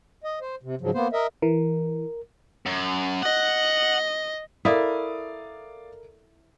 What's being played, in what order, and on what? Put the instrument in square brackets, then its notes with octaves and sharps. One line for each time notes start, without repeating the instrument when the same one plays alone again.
[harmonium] D#5
C5
C3
G#2 C#3 F3 F#3
A#3 B3 C5
A#4 D#5 E5
[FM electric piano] E3 [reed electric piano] A#4
[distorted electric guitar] F#2
[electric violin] D#5 [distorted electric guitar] F#5
[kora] E4 [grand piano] A4 A#4 [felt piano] D5 F5 D#6